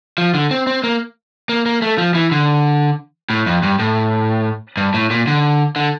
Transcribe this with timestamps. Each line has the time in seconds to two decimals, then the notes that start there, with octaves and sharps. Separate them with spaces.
0.18 F3
0.34 D3
0.51 C4
0.67 C4
0.84 A#3
1.49 A#3
1.66 A#3
1.82 A3
1.98 F3
2.15 E3
2.32 D3
3.30 A2
3.46 F2
3.63 G2
3.79 A2
4.77 G2
4.94 A2
5.11 A#2
5.27 D3
5.76 D3